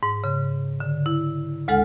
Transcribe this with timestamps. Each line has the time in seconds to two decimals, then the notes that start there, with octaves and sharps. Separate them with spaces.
0.03 G#2
0.24 C#3
0.80 D3
1.06 E4
1.68 D2 G#3 A4 F#5 F6